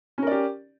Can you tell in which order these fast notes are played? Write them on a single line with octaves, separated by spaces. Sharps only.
C#4 A#4 D5 G4